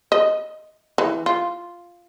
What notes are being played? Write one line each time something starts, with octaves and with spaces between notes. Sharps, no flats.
D#5
E3
F4